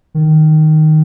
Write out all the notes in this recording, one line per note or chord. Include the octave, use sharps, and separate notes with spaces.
D#3